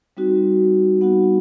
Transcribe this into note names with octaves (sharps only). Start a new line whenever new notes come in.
G3 C4 D#4 F#4
G3 B3 D#4 F#4 F#5